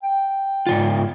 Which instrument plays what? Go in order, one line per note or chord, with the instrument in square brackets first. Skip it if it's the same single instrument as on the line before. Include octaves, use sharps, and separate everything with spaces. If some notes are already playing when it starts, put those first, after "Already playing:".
[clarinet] G5
[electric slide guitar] G#2 D#3 F4